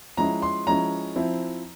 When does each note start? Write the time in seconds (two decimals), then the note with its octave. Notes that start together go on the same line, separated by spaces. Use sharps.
0.17 F3 G#3 C#4 E4 A#5
0.42 C6
0.67 F3 G#3 C#4 E4 A#5
1.16 F3 C4 E4